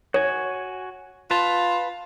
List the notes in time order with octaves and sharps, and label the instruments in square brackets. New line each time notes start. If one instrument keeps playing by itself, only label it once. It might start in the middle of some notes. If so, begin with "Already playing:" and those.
[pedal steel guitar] F#4 G#5 [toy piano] C#5
[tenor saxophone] F4 [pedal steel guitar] B4 A5